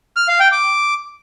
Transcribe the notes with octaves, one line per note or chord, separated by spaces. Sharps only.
F6
F5
G5
D6